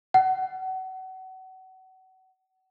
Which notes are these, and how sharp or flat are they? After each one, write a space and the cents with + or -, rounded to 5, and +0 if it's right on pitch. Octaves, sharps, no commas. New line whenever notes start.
F#5 +30